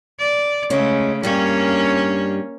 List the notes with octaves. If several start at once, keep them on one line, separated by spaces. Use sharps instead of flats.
D5
C#3 G#3 A3 C#4
G2 G3 A#3 C#4 C#5